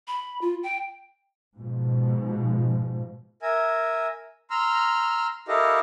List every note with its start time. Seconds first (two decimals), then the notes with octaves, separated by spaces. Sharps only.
0.08 B5
0.41 F4
0.63 G5
1.56 G#2 B2 F3
3.42 A#4 E5 G#5
4.50 A#5 C6 E6 F6
5.48 E4 G4 A4 A#4 D#5 F5